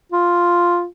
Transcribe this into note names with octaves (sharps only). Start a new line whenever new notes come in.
F4